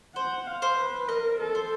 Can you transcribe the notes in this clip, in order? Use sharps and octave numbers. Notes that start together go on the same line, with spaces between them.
C5 F#5
F5
C5
B4
A#4 D#5
A4
C5